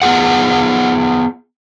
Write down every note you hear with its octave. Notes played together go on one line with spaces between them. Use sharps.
B3 F4 G#4 F#5